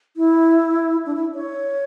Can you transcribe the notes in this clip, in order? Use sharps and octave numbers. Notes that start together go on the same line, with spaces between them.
E4
D4
E4
C#5